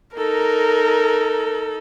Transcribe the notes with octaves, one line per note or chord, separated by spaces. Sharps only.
D#4 A4 A#4